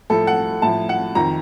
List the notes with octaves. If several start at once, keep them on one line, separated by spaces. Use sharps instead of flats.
A2 F3 A4
F#5
A2 F3 A5
F#5
F2 D#3 A#5